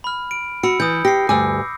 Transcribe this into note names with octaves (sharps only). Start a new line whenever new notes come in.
B5 F6
D7
F#4 B5 E6 C#7
E3 D#6 G6
G4 A#6 C7
D2 G2 G#5 D6 E6